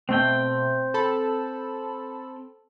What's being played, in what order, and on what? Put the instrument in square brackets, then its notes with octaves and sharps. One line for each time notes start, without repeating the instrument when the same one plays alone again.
[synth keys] B2 A3 [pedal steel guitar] C4 G5
[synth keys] A4 A5 B5